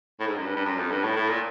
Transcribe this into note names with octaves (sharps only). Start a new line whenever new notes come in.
A2
G#2
F#2
G2
G2
F#2
F2
G2
A2
A2
A#2